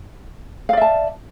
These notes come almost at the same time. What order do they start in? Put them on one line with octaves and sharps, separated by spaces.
F5 D5 E5 A5